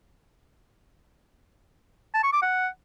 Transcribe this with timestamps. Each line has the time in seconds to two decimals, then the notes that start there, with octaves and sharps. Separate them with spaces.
2.14 A5
2.23 C#6
2.33 D6
2.42 F#5